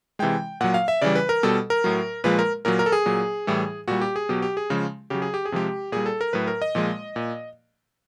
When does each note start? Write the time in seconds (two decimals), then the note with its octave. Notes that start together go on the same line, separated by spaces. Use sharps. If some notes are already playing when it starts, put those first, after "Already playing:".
0.19 C3 E3 G#3 G5
0.61 A#2 F#3 F#5
0.74 F5
0.88 E5
1.02 C#3 E3 G3 D5
1.15 B4
1.29 A#4
1.43 B2 G3 A4
1.70 A#4
1.84 A2 F#3
2.24 A#2 F3 G#3 B4
2.39 A#4
2.65 A#2 F#3 A#4
2.79 A#4
2.86 A4
2.92 G#4
3.06 A#2 F#3
3.47 A2 E3 G3
3.88 A#2 G3 F#4
4.01 G4
4.16 G#4
4.29 B2 F#3 G4
4.42 G4
4.57 G#4
4.70 C#3 F3 G#3
5.10 C#3 F#3 G4
5.22 G#4
5.34 G4
5.45 G#4
5.52 C3 F3 G#3 G4
5.92 A#2 G3 G#4
6.06 A4
6.21 A#4
6.33 A2 F#3 B4
6.47 A#4
6.62 D#5
6.75 A#2 F3 G#3
7.16 A#2